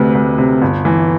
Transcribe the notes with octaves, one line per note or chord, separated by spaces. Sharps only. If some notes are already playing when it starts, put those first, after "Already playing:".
Already playing: D2 C3 B4
D2
C3
G1
E3